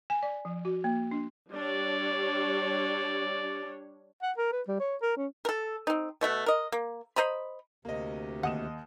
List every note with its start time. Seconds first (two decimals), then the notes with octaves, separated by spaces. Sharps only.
0.10 G#5
0.23 D5
0.45 F3
0.65 F#4
0.84 A#3
1.11 D4
1.52 G3 D4 C#5 D5
4.23 F#5
4.37 A#4
4.52 B4
4.68 G3
4.80 C#5
5.02 A#4
5.17 C#4
5.45 A4 A#4
5.87 C4 D#4
6.21 B2 A3 E5 F#5
6.46 A#4 D#5
6.72 A#3
7.16 C5 D#5 A#5 B5
7.85 D2 C3 A#3 D#5
8.43 D#2 D#5 F#5 D#6 E7